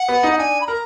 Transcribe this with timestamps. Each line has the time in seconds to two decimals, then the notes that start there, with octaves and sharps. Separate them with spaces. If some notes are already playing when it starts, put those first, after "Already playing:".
Already playing: F#5
0.08 B3
0.23 D#4
0.33 F#5
0.38 D4 G#5
0.60 B5
0.66 A#4 A#5